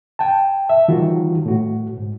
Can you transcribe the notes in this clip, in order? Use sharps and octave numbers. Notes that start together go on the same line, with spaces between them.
G5 A5
E5
D#3 E3 G3 F4 F#4
A2 F#4
G#2